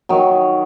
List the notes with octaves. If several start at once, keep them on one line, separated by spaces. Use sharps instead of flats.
D#3 F#3